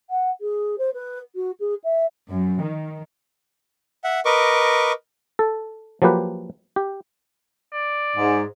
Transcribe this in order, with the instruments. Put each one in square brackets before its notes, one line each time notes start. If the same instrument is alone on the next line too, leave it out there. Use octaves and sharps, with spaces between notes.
[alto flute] F#5
G#4
C5
B4
F#4
G#4
E5
[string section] F#2
D#3
[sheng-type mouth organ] E5 F#5
A#4 B4 D#5 C#6 D6
[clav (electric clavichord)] A4
F3 F#3 A#3 G4 B4
G4
[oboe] D5
[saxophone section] G#2